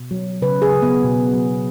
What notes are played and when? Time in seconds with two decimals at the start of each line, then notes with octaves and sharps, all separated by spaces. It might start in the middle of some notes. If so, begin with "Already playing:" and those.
Already playing: B2
0.11 F#3
0.42 C#3 B4
0.62 G#4
0.72 C#3
0.82 B3
1.04 B2
1.34 F#3